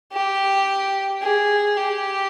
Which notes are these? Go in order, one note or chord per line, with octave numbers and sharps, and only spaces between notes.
G4
G#4
G4